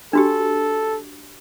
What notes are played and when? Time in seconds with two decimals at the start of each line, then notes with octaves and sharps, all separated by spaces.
0.13 D4 F#4 G4 A4